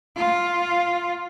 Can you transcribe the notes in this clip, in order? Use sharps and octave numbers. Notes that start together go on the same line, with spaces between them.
F4